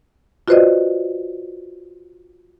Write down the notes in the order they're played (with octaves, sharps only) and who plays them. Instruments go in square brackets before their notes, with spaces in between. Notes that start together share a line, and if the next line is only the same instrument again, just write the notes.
[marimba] F4 F#4 B4 C5 D5 D#5